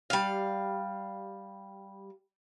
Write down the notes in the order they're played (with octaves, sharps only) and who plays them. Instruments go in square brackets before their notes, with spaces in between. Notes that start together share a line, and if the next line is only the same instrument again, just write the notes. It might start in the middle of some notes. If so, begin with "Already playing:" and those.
[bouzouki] G3 F5